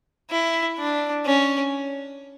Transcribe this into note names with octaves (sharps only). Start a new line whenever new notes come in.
E4
D4
C#4